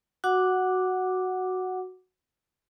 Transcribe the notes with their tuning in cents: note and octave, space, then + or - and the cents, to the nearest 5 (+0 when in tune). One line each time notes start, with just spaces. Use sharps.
F#4 +0 F#5 +0 D6 +0